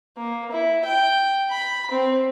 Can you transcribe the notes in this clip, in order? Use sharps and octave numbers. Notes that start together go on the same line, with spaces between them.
A#3
E4
G5
B5
C4